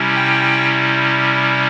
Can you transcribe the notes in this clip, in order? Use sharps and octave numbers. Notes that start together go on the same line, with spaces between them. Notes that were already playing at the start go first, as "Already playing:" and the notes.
Already playing: C3 G3 C#4 E4
G5